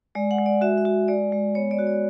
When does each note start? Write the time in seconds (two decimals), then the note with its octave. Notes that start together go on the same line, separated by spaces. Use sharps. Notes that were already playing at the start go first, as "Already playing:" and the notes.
0.15 G#3 D5
0.31 F#5
0.38 G#3
0.46 D5
0.61 F#4 E5
0.78 E5
0.85 F#4
1.08 G#3 D5
1.32 G#3
1.55 B3 C#5
1.71 D5
1.79 F#4
1.87 D5